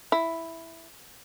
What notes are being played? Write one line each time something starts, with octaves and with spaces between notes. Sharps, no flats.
E4